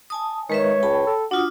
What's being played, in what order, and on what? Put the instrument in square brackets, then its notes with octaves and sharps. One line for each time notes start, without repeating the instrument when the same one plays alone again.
[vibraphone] G#5 A5 D#6
[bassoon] D#3 [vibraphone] G#3 B4 E5 [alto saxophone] C#5
[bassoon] C#2 [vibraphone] G5 A5 B5
[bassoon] A4
[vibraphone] D4 F4 D#6 [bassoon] F#4